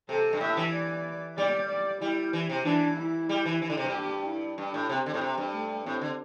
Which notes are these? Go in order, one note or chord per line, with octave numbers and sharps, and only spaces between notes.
C3 A4
G2
A2 E5
E3
D5
G3 D5
D5
G3 E4
E3
C3
E3 D4
E4
G3
E3
E3
D3
C3
G2
G4
E4
G2 D4
A2
C3 C4
D3
A2
C3
G2
A3
A2 C4
D3